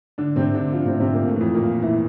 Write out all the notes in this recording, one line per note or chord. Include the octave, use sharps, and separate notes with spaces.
D3 D4
C3 C4
D3 D4
F3 F4
C3 C4
C3 C4
A#2 A#3
A2 A3
E3
F2 F3
A#2 A#3
E3 E4